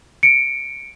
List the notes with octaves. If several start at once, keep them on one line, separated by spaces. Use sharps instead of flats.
C#7 D7